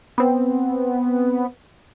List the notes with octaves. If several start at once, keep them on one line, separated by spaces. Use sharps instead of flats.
B3 C4